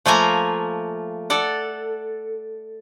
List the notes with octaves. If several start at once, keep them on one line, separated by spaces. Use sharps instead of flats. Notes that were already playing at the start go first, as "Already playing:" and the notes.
F3 A3 A#3 G#5 A#5
A4 D5 F#5